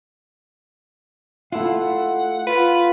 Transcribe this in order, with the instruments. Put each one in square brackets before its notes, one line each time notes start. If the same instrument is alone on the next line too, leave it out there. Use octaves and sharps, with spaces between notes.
[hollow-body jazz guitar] A3 E4 F4 [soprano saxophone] F#5
[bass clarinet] F4 [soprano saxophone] B4